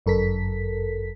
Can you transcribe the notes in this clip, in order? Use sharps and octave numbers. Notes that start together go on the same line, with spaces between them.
G1 F#2 A4 A#4 B6